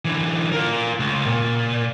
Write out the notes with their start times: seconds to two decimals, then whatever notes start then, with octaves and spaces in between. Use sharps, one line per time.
0.05 D3 E3
0.52 F4 A#4
1.00 C#2
1.26 A#2